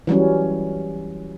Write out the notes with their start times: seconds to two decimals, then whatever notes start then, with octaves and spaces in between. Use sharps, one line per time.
0.07 E3 F#3 G3 C#4